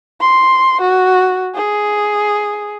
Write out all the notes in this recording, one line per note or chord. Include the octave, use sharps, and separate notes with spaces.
C6
F#4
G#4